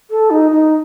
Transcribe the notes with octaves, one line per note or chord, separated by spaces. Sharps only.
A4
D#4
D#4